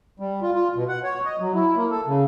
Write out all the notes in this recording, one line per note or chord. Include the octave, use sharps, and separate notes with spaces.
G3
F4
F4
B2
F#5
C#5
D#5
F#3
E4
A#3
A4
C#3